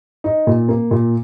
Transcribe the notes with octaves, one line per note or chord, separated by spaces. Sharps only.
D#4
A#2
A#3
A#2